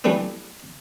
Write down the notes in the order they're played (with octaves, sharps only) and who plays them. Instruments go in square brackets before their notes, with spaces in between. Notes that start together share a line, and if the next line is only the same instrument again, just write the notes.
[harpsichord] E3 F#3 G3 A3 B3 D4